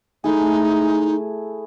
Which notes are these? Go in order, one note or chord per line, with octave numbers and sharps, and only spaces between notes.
A3 D#4 E4 G#4